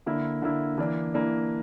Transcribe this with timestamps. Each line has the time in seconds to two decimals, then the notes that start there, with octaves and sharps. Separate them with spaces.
0.06 D3 A#3 E4
0.42 D3 A#3 E4
0.78 E3 A#3 D4
1.14 E3 A#3 D4